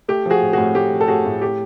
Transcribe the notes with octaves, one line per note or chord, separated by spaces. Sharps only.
A3 G4
F3 F#4 G#4
A2
A2 F#4 G#4
A3 G4
F3
A4
A2 F#4 G#4
A2
A3 G4